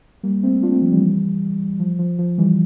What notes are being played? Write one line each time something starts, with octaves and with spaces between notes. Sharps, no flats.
G3 A#3
A3 C4
D4 F4
A3 C4
F3
E3 G3
F3
F3
F3
E3 G3